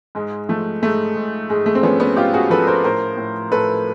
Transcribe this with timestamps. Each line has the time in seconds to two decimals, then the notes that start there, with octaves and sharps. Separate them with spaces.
0.15 G#2 G#3
0.49 F3 A3
0.82 G#2 A3
1.16 G#2
1.49 G#2 G#3
1.66 A3
1.75 C4
1.83 F3 B3 C#4
2.00 B3 C#4
2.17 G#2 F4 G4
2.34 F#4 G#4
2.50 F3 A4 B4
2.67 A#4 C5
2.84 A2 A#4 C5
3.17 A2
3.52 A2 A4 B4